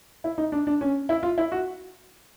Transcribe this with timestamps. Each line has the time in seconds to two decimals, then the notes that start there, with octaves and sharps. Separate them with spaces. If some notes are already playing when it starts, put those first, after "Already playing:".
0.24 E4
0.38 D#4
0.52 D4
0.67 D4
0.81 C#4
1.09 E4
1.23 F4
1.38 E4
1.52 F#4